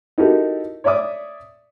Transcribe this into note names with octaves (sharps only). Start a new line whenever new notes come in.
D#4 E4 F#4 G4 A4 A#4
C#5 D5 E5 D6 D#6